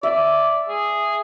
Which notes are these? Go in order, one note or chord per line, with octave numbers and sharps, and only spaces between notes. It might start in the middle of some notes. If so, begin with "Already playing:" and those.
D5 E5
G#4